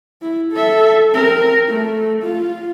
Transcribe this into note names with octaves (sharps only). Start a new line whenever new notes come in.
E4
A4 E5
C4 A#4
A3
F4